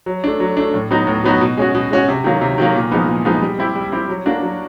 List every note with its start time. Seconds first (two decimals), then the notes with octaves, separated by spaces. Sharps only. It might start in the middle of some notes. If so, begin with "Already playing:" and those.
0.06 F#3
0.24 A3 D4
0.40 F#3
0.57 A3 D4
0.74 A2
0.91 F#3 B3 D#4 F#4
1.07 A2
1.24 F#3 B3 D#4 F#4
1.41 B2
1.57 G#3 C#4 F#4
1.75 B2
1.91 G#3 C#4 F#4
2.08 C3
2.24 D#3 F#3 A#3
2.41 C3
2.58 D#3 F#3 A#3
2.75 A#2
2.91 F3 G#3 B3 D#4
3.08 A#2
3.25 F3 G#3 B3 D#4
3.42 G3
3.58 C4 E4 G4
3.75 G3
3.92 C4 E4 G4
4.09 F#3
4.26 A#3 D4 F#4
4.42 F#3